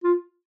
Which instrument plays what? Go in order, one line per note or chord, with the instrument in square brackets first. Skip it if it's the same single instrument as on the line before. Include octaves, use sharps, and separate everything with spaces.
[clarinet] F4